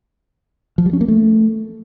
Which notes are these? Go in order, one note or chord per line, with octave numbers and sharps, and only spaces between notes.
F3
G3
C#4
A#3
A3